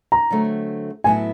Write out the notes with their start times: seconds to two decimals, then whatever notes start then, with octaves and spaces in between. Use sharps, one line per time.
0.12 A#5
0.30 D3 F#3 A3 C4
1.04 A2 F#3 B3 E4 G#5